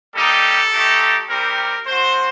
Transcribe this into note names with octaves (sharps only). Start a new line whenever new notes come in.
G3 A#3 D#4 G4 A4
A3 D#4 G4
G3 C4 D#4 G4 A#4
A3 C4 F#4 C5